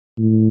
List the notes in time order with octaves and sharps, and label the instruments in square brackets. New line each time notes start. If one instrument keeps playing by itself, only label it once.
[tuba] A2